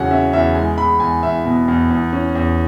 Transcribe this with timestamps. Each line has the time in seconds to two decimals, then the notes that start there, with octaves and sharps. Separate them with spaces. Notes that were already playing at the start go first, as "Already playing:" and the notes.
Already playing: E2 C#3 F#3 C#4 F#5 G#5
0.11 C#4 E5
0.33 E2 E5
0.55 G#3 G#5
0.77 E2 B5
1.00 E2 G#5
1.23 E2 E5
1.45 B2
1.68 E2
1.90 E2
2.13 C#4
2.35 E2